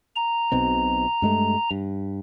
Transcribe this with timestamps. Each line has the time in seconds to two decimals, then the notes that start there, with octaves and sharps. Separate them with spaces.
0.16 A#5
0.52 B1 B2 C4
1.22 G2 G#3 A3
1.71 G2